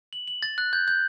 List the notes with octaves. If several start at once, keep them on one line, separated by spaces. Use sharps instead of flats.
F#7
F#7
A6
F#6
G6
G6